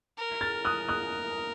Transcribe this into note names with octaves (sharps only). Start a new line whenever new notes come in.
A#4
F6 A6
D#6 F#6
D#6 F#6